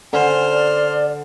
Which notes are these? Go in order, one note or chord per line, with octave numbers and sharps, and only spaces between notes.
D3 C5 G#5 F6
D5